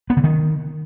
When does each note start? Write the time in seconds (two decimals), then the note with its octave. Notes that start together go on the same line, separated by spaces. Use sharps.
0.10 B3
0.17 D3
0.24 D#3